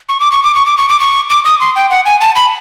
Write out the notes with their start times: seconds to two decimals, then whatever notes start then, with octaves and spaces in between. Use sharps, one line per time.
0.09 C#6
0.20 D6
0.32 C#6
0.43 D6
0.55 C#6
0.66 D6
0.78 C#6
0.89 D6
1.00 C#6
1.30 D6
1.45 D#6
1.60 C6
1.76 G5
1.90 F#5
2.06 G#5
2.21 A5
2.36 B5